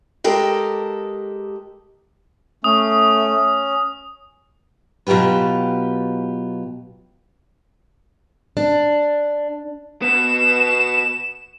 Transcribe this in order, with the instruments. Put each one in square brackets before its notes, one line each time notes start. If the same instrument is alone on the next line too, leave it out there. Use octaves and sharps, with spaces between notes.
[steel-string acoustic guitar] G#3 G4 A4 A#4
[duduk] A3 [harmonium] C#4 [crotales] D#6
[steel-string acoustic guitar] B2 F#3 F4 G4 B4
D4
[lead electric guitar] B2 B3 [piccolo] E7